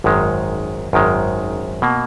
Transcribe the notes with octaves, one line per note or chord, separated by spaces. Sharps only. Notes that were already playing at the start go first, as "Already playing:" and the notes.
G#1 F#2 D#3 G#3
G#1 F#2 D#3 G#3
B2 A#3